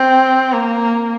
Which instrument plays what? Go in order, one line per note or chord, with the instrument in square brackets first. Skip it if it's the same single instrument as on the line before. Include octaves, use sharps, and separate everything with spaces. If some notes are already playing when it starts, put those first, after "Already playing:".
Already playing: [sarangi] C4
A#3